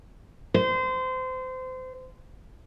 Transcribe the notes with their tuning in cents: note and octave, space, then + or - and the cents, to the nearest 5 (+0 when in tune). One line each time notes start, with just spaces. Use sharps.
C5 -25